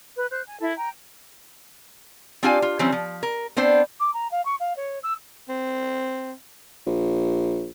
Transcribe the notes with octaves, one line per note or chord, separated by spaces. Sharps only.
B4
C5 F#6 G6
G#5
E4 A4
G5 A#5
C4 D4 F4 G4 F5 G#5
F4
E3 F#3 G3 C4 C#4
F3
A#4
B3 C4 D4 C5
D6
A#5
F5
C#6
F5
C#5
E6
C4
A#1